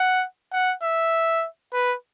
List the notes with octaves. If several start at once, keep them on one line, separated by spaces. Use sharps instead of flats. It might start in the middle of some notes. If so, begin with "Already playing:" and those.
Already playing: F#5
F#5
E5
B4